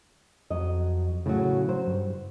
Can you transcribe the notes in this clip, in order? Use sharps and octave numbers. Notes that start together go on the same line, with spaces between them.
F2 F#3 D#5
A2 C#3 F#3
F#3 C5
G2